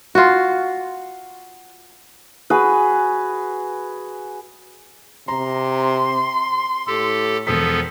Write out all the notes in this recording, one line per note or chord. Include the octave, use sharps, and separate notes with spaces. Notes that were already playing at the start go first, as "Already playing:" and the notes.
F4 F#4
F#4 G#4 B4
C3 A#5 C6
A2 G4 A4
E1 F3 B3 A4 D#6 B6